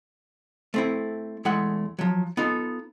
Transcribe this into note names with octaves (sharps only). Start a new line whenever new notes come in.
A3 C4 E4
E2 G#3 A3 E4 F#5
F3 F#3
B3 D#4 F4 A4